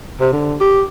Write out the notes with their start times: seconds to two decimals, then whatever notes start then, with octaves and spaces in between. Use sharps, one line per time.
0.20 C3
0.33 D3
0.61 G4